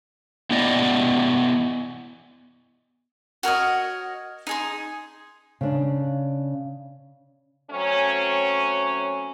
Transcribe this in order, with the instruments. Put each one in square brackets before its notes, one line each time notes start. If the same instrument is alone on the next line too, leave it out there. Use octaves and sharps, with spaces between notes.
[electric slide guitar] B3 E4 G4 D5 D#5
[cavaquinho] F#4 A#4 C#5 D#5
D#4 G#4 C6
[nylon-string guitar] C#3 D4
[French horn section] F#3 A3 C4 C#4